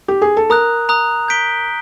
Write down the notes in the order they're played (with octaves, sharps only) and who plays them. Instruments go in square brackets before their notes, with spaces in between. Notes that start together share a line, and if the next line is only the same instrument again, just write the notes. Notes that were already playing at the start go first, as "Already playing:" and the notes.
[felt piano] G4
G#4
A4
[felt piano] A#4 [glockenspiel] A#5 D#6 F#6
[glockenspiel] A#5 D#6 F#6
G6 B6 D7 G7